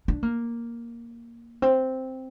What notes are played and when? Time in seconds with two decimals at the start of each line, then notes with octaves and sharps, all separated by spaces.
0.08 D4
0.23 A#3
1.62 C4